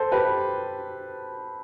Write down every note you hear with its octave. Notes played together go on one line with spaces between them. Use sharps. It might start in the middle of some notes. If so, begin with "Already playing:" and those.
Already playing: A4 C5
G4 B4